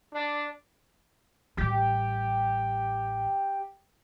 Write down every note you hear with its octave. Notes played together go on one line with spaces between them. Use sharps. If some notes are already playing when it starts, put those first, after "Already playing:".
D4
A1 G3 G4